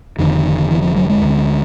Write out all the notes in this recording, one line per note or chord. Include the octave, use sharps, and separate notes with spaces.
F1 F2 D3 D#3
E3
F3
F#3
G#3
D2 D3